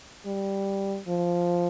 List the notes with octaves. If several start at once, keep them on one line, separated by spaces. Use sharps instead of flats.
G3
F3